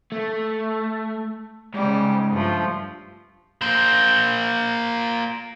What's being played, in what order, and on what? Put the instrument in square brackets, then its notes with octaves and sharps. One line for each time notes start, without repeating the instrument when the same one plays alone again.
[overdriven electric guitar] A3
[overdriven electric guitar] G#2 [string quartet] C#3 G3
[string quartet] G2 F3 A3
[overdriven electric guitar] A#3 C5